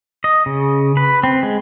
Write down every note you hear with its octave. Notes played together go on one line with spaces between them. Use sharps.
D#5
C#3
B4
C4
G#3